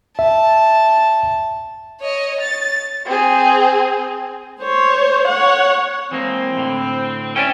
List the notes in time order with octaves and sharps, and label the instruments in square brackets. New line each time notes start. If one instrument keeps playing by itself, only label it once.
[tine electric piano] E5 [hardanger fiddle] A5
[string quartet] C#5 D#5
A6
[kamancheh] C4 G#4
[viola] C5 C#5
C#5 F#5
[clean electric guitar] E3 G#3 A#3 [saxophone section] C4
[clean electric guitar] A2 D3
[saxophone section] C#4 [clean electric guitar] D5 E5 G5